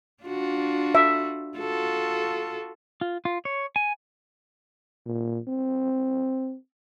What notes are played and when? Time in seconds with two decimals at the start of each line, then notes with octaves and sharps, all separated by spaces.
0.24 D4 F4 F#4
0.95 E5
1.58 F4 F#4 A4
3.01 F4
3.25 F4
3.45 C#5
3.76 G#5
5.06 A#2
5.47 C4